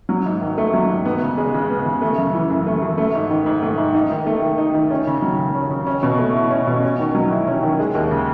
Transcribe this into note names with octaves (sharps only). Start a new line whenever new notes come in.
F#3
G#2
D#3
A3
F#3
G#2
B3
C#3
G#3
C#3
B3
C#3
A3
F#2
E3
F#2
A3
F#2
A3
G#2
D#3
G#2
A3
G#2
D#4
D#3
A3
D#3
D#4
D#3
C#4
C#3
F#3
C#3
C#4
C#3
C#4
B2
A3
E4
C#4
B2
C#4
D#3
F#3
E4
C#4
D#3
G#3
D#2
C#3